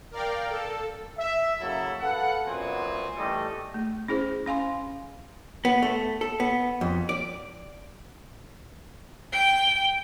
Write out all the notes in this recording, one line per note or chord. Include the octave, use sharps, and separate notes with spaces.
A#4 D5 F5 G5
A4
E5
C#3 F#3 A#3 E4 A4
A4 B4 F5 F#5
F#2 A#2 B3 C4 G#5
E3 G3 A3 A4 D#5
A3
C#4 E4 G#4 C5
C#4 F5 G#5 C6
B3
A3
A4
B3
F2
D5
G5